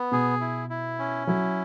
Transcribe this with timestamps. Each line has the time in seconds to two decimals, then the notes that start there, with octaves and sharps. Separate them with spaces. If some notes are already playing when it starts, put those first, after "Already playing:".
Already playing: B3
0.12 B2 G#4
0.41 E4
0.70 E4
0.99 C#4
1.27 F#3 E4